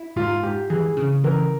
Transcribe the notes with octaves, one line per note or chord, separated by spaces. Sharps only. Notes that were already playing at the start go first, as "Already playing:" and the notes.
Already playing: E4
G#2 F4
G#2 G4
E3 G#4
C#3
E3 A#4